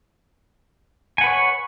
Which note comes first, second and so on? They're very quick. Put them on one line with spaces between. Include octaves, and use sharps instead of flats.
G#5 F#5 B4 C#5